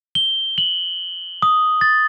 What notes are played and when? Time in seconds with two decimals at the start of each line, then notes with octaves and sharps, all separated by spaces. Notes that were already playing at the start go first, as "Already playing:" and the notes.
0.15 G7
0.58 F#7
1.42 D#6
1.81 A6